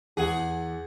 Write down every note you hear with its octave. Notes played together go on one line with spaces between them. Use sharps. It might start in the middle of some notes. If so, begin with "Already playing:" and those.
E2 G#4 F#5 F#7